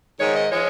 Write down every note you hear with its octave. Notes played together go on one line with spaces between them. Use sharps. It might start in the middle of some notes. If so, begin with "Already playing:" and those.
G#2 D#3 G#3 C#5
D#5
F3 G#3 C#5